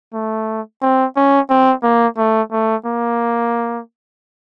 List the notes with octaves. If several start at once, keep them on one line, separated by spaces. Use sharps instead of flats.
A3
C4
C#4
C4
A#3
A3
A3
A#3